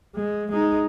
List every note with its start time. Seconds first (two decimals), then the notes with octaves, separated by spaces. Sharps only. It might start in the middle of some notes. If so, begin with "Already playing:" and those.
0.16 G#3
0.52 G#3 D#4